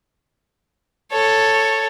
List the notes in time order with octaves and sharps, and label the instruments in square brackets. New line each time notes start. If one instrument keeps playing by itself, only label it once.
[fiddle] A4 C#5